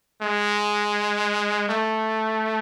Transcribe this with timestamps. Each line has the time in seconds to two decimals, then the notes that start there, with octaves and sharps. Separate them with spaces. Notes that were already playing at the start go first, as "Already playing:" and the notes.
0.22 G#3
1.69 A3